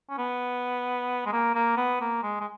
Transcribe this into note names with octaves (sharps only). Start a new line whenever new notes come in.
C#4
B3
G#3
A#3
A#3
B3
A#3
G#3
G#3